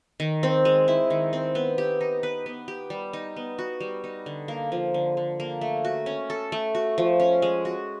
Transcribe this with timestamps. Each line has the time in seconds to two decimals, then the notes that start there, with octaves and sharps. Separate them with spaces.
0.20 D#3
0.43 C4
0.65 G#3
0.88 E4
1.10 D#3
1.33 C4
1.55 B3
1.78 G4
2.01 D#4
2.23 B4
2.46 B3
2.68 G4
2.90 G3
3.13 D#4
3.37 B3
3.59 F#4
3.81 G3
4.04 D#4
4.26 D3
4.48 A#3
4.72 F3
4.94 D3
5.17 D3
5.40 A#3
5.61 A3
5.85 F#4
6.06 C#4
6.30 A4
6.52 A3
6.75 F#4
6.98 F3
7.20 C#4
7.42 G#3
7.65 F#4